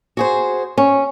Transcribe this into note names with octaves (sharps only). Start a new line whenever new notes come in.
F#4 G#4 C5
C#4